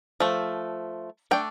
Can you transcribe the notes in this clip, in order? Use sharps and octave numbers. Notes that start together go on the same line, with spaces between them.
F3 A3
A3 D4 G5